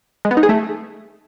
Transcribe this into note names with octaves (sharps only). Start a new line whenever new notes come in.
G#3
B3
D#4
G#4
A3